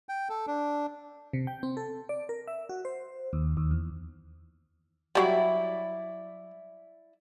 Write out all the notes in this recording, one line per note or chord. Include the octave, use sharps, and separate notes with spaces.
G5
A4
D4
C3
G5
C4
A4
D5
A#4
E5
F#4
C5
D#2
D#2
E2
F#3 G3 E4 D5